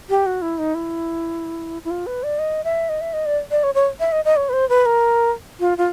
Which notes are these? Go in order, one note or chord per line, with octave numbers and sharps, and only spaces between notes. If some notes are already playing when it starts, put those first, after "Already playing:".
G4
F#4
E4
D#4
E4
E4
F4
B4
D5
D#5
E5
D#5
E5
D#5
D5
D5
C#5
C#5
E5
D#5
D#5
C#5
B4
C5
B4
A#4
F4
F4